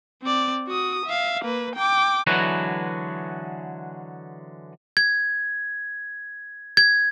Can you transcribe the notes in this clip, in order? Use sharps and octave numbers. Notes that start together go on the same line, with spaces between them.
C4 D5
F#4 D#6
E5 F5
A#3 B4
G5 D6
D3 E3 F#3 G#3 F#4 B4
G#6
G#6